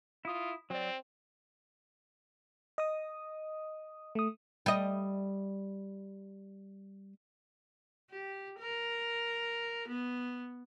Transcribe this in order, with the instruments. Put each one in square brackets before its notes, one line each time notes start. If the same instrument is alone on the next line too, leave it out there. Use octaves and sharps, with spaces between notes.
[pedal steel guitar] E4 D#6 [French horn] F4
[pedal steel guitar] F#3 D5 [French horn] C4
[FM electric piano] D#5 D#6
A3 D#6
[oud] G3 D#5
[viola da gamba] G4
A#4
B3